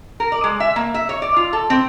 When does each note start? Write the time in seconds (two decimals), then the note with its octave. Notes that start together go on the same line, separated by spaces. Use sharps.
0.20 A#4
0.32 D5
0.44 G#3
0.60 E5
0.76 A#3
0.94 E5
1.09 C#5
1.22 D5
1.36 F4
1.53 A4
1.70 C4